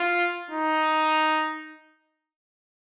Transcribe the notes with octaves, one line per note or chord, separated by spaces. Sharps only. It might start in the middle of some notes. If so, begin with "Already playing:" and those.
Already playing: F4
D#4